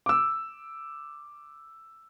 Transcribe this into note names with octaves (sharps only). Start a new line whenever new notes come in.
D6 E6